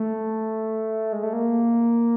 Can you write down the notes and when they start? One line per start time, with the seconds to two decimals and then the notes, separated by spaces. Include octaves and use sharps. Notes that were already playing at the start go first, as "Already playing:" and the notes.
Already playing: A3
1.13 G#3
1.23 A3
1.33 A#3